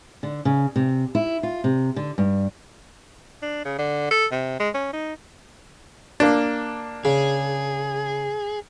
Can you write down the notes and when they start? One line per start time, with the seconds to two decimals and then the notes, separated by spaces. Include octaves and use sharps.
0.23 D3
0.45 C#3
0.76 C3
1.15 E4
1.43 F4
1.64 C3
1.96 D3
2.18 G2
3.42 D4
3.65 C#3
3.79 D3
4.11 A4
4.32 C3
4.60 G#3
4.74 C#4
4.93 D#4
6.20 A#3 D4
7.05 C#3 G#4